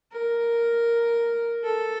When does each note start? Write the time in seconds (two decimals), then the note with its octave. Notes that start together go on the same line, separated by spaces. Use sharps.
0.12 A#4
1.64 A4